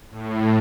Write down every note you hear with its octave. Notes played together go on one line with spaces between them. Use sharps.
A2